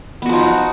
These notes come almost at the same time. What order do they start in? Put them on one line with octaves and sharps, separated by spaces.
B3 F#4 F3 D#4